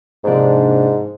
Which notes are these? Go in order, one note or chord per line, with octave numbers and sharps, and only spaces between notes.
G#2 C3 F3 A#3 D4